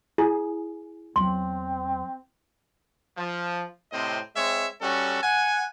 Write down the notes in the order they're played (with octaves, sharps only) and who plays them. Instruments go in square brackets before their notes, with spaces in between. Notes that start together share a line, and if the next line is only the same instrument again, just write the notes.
[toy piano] E4 [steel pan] G#4
[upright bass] E2 F#3 [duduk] C4 [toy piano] C6
[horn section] F3
A2 C3 C4 D#5
G#3 C4 C#5 E5
G3 C#4 F#4 A4
F#5 G#5